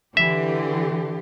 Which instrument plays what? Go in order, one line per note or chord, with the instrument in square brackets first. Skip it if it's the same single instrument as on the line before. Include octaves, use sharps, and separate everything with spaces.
[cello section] D3 E3 G4 [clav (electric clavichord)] E5